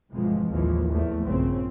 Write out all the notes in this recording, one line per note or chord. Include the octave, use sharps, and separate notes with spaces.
G1 F2 B2 E3 F3 G#3
A1 D#2 E3 F3
E2 A3
A#1 G2 C#3 C4